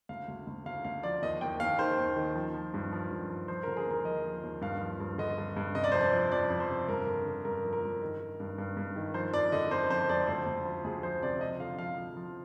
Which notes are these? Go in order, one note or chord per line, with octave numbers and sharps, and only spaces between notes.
D2 F5
D2
D2
D2 F5
D2 F5
F3 D5
D#2 D#5
D#2 G5
D#2 F5
D#3 C5
D#2
D#3
F3
F3
G2
F3
G2
F3
F3 C5
D3 A#4
G#4
D#2 A#4
F3 D#5
F3
D#2
G2 F5
F3
G2
D3 D#5
G2
G2
C3 D#5
D5
F2 C5
D5
F3
F2 D5
F2
C5
C3
G2 A#4
D3
D3
G2 A#4
F3
A#4
G2
D#3
D#3
G2
G2
G2
D#3
F3 C5
F2 D5
D3 D#5
F2 C5
F2 C5
F2 D5
D2 C5
D2
F3
D2 G#4
F3 C5
C3 D5
F3 D#5
D3 F5
F3 F5
F3
F3